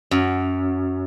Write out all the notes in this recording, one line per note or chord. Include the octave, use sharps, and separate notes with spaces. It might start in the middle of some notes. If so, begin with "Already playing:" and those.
F#2